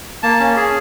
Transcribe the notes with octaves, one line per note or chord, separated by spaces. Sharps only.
A#3 A5
C#4
G#4